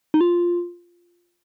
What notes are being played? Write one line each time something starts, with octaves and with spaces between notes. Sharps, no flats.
D#4
F4